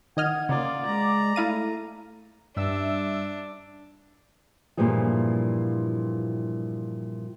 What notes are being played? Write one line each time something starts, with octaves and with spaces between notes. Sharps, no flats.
D#3 D#5 F#5 F6 G#6
C#3 A#3 F4 D5
G#3 A#5
A3 E4 F5 D#7
G2 D4 E5 E6
G2 A#2 E3 F3 G3 G#4